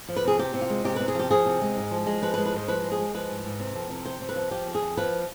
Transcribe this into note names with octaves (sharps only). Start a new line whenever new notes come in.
F3
B4
C3 G#4
C3 G4
C3
F4
G#3
C3 G4
C3 B4
G#4
F3 G4
F3 G#4
C3
G#3
G#2
F3
G#3
F3 B4
B4
G#3
B4
G#2 C5
F3 B4
G#3
G#4
G#3
F3 B4
G#2
G#2
C3
F2
C3
F2 C5
C3
B4
F3
F3 G4
F2
G#4
F2
F3 B4